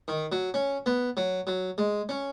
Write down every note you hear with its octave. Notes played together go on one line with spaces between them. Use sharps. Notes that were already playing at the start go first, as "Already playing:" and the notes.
D#3
F#3
C#4
B3
F#3
F#3
G#3
C#4